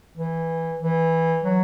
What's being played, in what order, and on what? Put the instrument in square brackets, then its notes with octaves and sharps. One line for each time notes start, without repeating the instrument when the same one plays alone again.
[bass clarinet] E3
E3
F#3